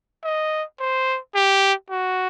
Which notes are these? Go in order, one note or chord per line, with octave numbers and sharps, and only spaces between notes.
D#5
C5
G4
F#4